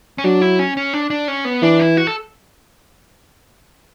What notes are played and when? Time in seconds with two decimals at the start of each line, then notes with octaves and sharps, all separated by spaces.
0.18 C#4
0.24 F#3 D4
0.41 E4
0.59 C#4
0.77 C#4
0.94 D4
1.10 D4
1.28 C#4
1.45 B3
1.62 E3 D4
1.80 E4
1.97 F#4
2.07 A4